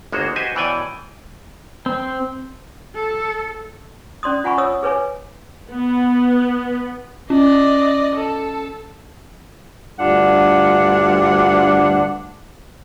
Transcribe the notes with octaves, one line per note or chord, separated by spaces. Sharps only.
G1 G#3 A#3 F#4 C5
F#4 G4 B4 C5 D#5 G#5
B2 E3 C#5 D5 G5 G#5
C4
A4
C#4 D5 C6 D#6
F4 F#5 G#5 B5 C#6
C#5 D#6 E6
G#4 B4 C#5 G#5
B3
C#4 D5 D#5
A4 A5
D2 G2 D4 F4 F#5